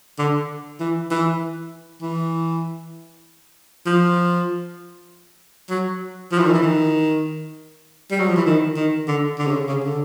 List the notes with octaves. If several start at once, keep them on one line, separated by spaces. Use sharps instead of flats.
D3
E3
E3
E3
F3
F#3
F3
E3
D#3
E3
D#3
G3
F#3
F3
E3
D#3
D#3
D3
D3
C#3
C#3
D3